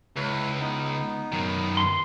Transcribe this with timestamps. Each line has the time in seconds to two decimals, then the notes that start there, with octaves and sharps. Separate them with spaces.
0.16 C#2 E4 B4
0.60 B3 D#4
1.32 F#2 D#3
1.77 C6